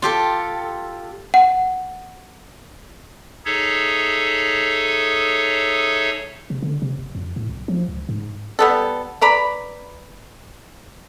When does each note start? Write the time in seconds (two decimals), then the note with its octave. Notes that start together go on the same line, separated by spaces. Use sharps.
0.02 F4 G4 A4
1.34 F#5
3.45 D#4 G#4 A4 C#5 E5
6.50 C3
6.62 D3
6.82 C3
6.98 F1
7.15 F2
7.36 A2
7.49 B1
7.68 F3
7.88 C#2
8.09 G#2
8.59 G3 B3 A4
9.21 B4 D5 A#5 B5